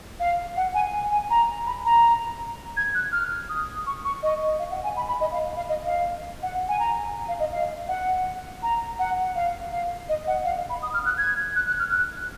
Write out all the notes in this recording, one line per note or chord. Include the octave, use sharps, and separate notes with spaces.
F5
F#5
G#5
G#5
G#5
A#5
B5
A#5
G#6
F#6
F6
D#6
C#6
C#6
D#5
F5
F#5
G#5
B5
B5
D#5
F5
F5
D#5
F5
F#5
G#5
A#5
F5
D#5
F5
F#5
A#5
F#5
F5
F5
D#5
F#5
F5
B5
D#6
F6
F#6
G#6
F#6
F#6
F6
F#6